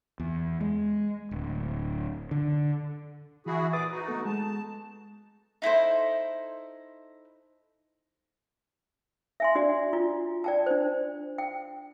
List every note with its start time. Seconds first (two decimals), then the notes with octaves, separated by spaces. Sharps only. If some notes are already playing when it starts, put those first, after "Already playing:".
0.20 E2
0.61 G#3
1.31 D1
2.31 D3
3.46 E3 E4 F#4 G#4
3.73 A#2 G#4 B4 D6 D#6 A6
3.91 D#4 F#4
4.08 A3 B3 A4
4.25 G#3 A5
5.62 D#4 E4 A4 C5
9.40 E5 G#5 C6
9.55 D4 F#4 D5 G#5
9.93 F4
10.44 D5 G5 A5
10.66 D4 C5
11.38 G5